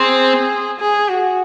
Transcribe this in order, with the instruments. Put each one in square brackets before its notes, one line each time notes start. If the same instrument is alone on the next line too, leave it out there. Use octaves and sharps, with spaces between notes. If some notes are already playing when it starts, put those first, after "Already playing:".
Already playing: [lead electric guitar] C4 [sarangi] G#4
[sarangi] G#4
F#4